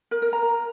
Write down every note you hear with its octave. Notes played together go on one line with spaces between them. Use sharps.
A#4
A#4
A#5